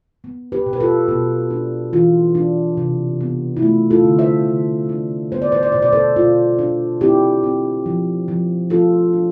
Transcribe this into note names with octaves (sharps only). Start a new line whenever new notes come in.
B3
G4 B4
B2
B4
F4 A4
B2
D4
E3 F4
D4
C3
B3
E4
A3 F4
F4 A4
D3
C5 E5
D3
D4
B3 C5
D5
C5
D5
B2 C5
D5
A4 C5
B2 F4
D4
C4 E4 G4
C4
F3
F3
F3 F4 A4
D4